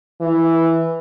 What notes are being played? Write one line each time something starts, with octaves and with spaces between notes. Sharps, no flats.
E3